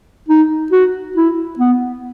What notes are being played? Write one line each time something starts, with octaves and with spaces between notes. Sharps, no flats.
D#4
F#4
E4
B3